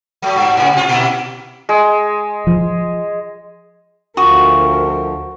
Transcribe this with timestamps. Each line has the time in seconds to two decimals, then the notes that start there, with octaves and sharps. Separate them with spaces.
0.22 F#3 A3
0.36 G2
0.57 G#2 C#3
0.73 C3 F4
0.89 A#2 E4
1.69 G#3
2.47 F3
4.17 D2 F3 F#4 A#4 D#6